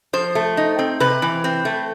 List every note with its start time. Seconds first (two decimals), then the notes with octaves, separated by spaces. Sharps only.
0.13 F3 C5
0.35 A3
0.57 D#4
0.79 C4
1.00 C3 B4
1.22 E3
1.44 C4
1.65 A3